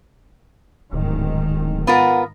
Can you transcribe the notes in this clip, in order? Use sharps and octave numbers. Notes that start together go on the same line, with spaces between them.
D1 G#2 D#3
B3 F4 A#4 F#5